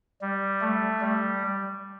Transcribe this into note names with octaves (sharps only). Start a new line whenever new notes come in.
G3
A3
G3